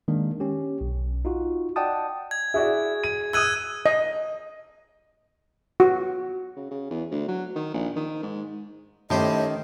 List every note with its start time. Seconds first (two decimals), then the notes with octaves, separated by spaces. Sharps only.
0.08 D#3 G#3 A#3 D4
0.40 C#4 G4
0.81 B1
1.25 D#4 F4 F#4
1.76 D5 D#5 F#5 G5 A5 D#6
2.31 G#6
2.54 E4 F#4 G#4 D5
3.04 D#7
3.33 D#6 E6 F#6 G#6 D#7
3.86 D#5
5.80 F#4
6.56 C#3
6.71 C#3
6.91 E2
7.11 D2
7.28 F#3
7.55 D#3
7.73 A#1
7.96 D#3
8.23 G#2
9.10 A2 D#3 C#4 G4 C5 D#5